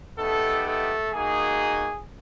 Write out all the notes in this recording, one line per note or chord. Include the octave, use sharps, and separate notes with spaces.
A3 B3 D#4 G4 A4
A3 A4
A#3 D#4 F#4 G#4